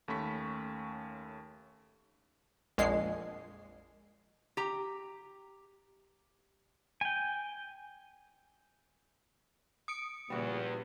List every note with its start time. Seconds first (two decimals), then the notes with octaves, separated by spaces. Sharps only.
0.08 D#2 A3 C#4 B5 C#6 B6
2.78 A#1 F2 G#3 C7
4.57 G4 A#5
7.01 G5 G#5
9.88 D#6 C#7 D7
10.30 E2 A#2 C#3 F3 G3 F#4